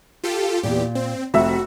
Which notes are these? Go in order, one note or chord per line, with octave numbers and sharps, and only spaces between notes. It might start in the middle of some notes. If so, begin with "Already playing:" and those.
F4 G4 A4
E2 A#2 G4
C4
F1 C4 F#4 E5 E6